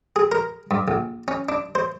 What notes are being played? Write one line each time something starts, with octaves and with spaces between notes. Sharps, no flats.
G#4
A#4
G2
A#1
C#4
D4
C5